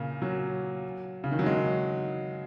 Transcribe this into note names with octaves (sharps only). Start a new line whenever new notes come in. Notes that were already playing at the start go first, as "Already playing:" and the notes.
Already playing: A#2 C#3
F#3
C#3
D#3
F#3
G#3